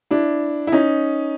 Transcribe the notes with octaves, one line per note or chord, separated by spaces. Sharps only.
D4 E4
E4
C#4 D#4